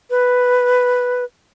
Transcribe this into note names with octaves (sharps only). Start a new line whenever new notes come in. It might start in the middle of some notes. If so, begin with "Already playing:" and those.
B4